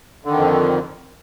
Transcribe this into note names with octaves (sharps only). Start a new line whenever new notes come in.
F2 D3 D#3